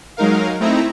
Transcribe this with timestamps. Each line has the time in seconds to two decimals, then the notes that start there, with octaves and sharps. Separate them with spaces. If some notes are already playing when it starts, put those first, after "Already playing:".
0.17 F#3 G#3 D#4 A#4 F5
0.60 A3 C4 D#4 E4 A#5